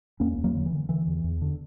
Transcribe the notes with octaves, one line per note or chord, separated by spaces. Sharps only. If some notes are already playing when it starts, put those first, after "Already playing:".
E2 A#3 C#4
E2
F#3 A#3
D3
E3
D3
D3 E3
E2
E2
D3